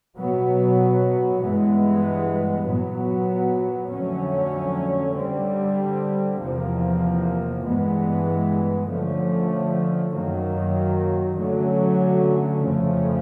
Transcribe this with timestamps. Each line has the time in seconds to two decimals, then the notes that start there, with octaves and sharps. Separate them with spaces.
0.19 B2 F#3 B3
1.43 G2 E3 G#3 B3
2.68 A#2 F#3 B3
3.91 F2 D3 F#3 A3 C#4
5.16 D3 G3 C4
6.40 E2 C3 F3 A#3
7.65 G2 E3 G#3 B3
8.88 D3 F3 A3 C#4
10.13 F#2 D#3 F#3 A#3
11.37 D3 F#3 A3 C#4
12.61 F2 C#3 F3 A3 C#4